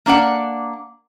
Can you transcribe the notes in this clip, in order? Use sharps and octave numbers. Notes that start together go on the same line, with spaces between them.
A#3 D4 D5 F#5